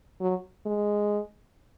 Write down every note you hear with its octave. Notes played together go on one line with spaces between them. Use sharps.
F#3
G#3